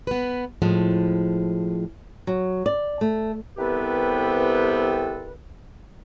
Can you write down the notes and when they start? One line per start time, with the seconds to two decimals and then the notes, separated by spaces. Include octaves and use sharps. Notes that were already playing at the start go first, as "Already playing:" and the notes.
0.07 B3 B4
0.62 A2 F3 G#3
2.27 F#3
2.66 D5
3.01 A3
3.57 C2 C3 B3 G4 A4 B4